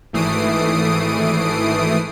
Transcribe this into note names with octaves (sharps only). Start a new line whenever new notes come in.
G#1 E3 A3 D#6 C7 D7